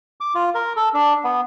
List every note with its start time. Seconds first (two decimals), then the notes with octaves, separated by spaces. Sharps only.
0.21 D6
0.35 F4
0.55 A#4
0.76 A4
0.94 D4
1.24 B3